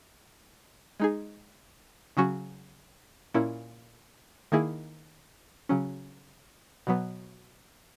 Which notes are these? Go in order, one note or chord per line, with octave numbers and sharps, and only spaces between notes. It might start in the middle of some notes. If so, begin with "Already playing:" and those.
G#3 D#4 G#4
C#3 F#3 C#4 F#4
A#2 A#3 C#4 E4
D#3 A#3 E4 G#4
C#3 F#3 C#4
B2 F#3 B3